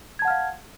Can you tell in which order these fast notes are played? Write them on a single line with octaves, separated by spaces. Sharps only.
G#6 A5 F#5 F6 F5